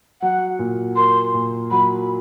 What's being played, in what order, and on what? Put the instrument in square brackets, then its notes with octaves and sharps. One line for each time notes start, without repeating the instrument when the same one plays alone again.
[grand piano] F#3 [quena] F#5
[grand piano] A#2
[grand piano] A#3 [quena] C6
[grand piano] A#2
[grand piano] F#3 [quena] B5